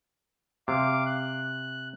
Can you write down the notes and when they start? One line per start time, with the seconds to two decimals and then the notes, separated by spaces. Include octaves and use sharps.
0.68 C3 F5 D6
1.06 F#6